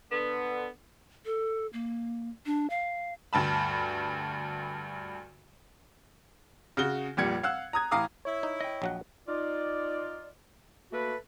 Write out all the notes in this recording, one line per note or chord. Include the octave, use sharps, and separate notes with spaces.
D3 B3
A4
A#3
D4
F5
D2 G2 A5 B5
C#3 F#4 G7
F1 A#2 G3 G#6 C#7
F5 F#5 E6 F#6
A#5 D#6 G#6
A2 E3 F5 A#5 D6 D#6
E4 C#5
D#4
D#5 G5
A#1 F#3 F#5
D#4 F4 D5
A3 A#3 F#4 A4 B4